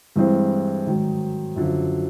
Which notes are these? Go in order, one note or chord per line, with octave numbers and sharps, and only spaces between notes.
G2 E3 G#3 C4
G#2 D#3 F#3
F#2 D3 F3